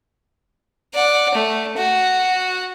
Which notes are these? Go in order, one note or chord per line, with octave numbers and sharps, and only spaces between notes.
D5 F#5
A3
F#4